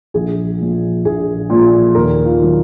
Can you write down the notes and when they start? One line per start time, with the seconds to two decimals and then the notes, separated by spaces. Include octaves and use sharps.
0.14 A#1 G#4
0.60 A#2 F3
1.05 A#1 G#4
1.50 A#2 F3
1.95 D#2 A#4
2.25 F4
2.41 D#3 F#3